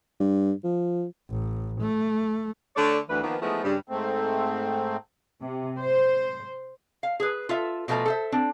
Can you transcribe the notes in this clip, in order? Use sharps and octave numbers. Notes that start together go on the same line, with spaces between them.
G2
F3
A1
A3
D3 A3 C#5 D5
D2 E3 B4
D#3 F3 A#3 B3
E3 F3 G#3 A3 B3 D#4
G2 C#3 G3
G#2 A3 C4
C3
C5
F5
G#4 B4
F4 A4 E5
B2 F3 A3 G#5 A#5
A4 C5 E5
C4 D4